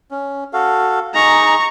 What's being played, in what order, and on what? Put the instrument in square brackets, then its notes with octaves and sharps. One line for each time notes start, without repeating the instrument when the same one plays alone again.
[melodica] C#4
F#4 A4 F5
[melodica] D#4 G#4 [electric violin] A#5 C#6